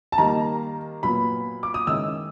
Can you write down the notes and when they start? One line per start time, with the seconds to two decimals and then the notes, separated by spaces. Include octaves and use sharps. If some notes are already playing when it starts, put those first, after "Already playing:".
0.12 A5
0.18 D#3 G3 A#3 A#5
1.03 A#2 F#3 B3 B5
1.63 D6
1.74 D#6
1.87 D#3 G#3 C#4 E4 E6